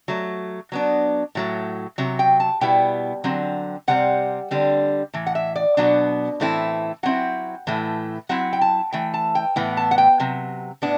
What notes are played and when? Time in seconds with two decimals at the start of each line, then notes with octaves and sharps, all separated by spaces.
0.08 F#3 A3
0.72 F#3 B3 D4
1.35 A2 F#3 A3
1.98 C3 F#3
2.19 G5
2.40 A5
2.61 B2 G3 B3 E4 G5
3.24 D3 F#3 C4
3.88 C3 G3 C4 F#5
4.51 D3 G3 C4
5.14 A2 E3
5.27 F#5
5.35 E5
5.56 D5
5.77 B2 F#3 B3 D4
6.40 A2 E3 A3 C4 E4
7.03 F#3 C4 E4 F#5
7.67 A2 E3 A3
8.29 F#3 C4 E4 F#5
8.53 G5
8.61 A5
8.92 E3 A3 G5
9.14 A5
9.35 G5
9.56 A2 E3 B3
9.77 A5
9.91 F#5
9.98 G5
10.20 C3 F#3
10.82 A2 B3 D4